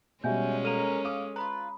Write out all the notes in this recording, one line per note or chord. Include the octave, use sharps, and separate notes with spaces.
B2 G3 G#3 C#4 E5 G#5 G6
A#3 A4 A#4 D#7 F7
F5 D6 D#6
F4 B4 A#5 B5